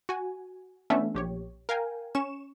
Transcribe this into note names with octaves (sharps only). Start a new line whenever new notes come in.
F#4 G#5
E3 A3 B3 C#4 D4 E5
A#1 G4 C#5
A#4 F5 G5 G#5
C#4 C#6 E7